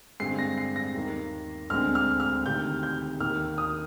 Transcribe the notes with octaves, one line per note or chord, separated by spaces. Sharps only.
G2 D3 G#3 C4 C7
A#6
C7
A#6
D#2 D#3 A#3
D2 D3 G#3 C4 F6
F6
F6
D2 C3 D#3 G6
G6
D#2 D#3 A#3 F6
D#6